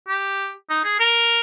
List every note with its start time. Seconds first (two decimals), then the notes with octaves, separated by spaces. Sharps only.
0.08 G4
0.70 D#4
0.84 G#4
1.00 A#4